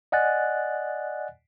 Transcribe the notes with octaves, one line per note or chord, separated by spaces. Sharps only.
D5 D#5 F#5 G#5 F#6 A6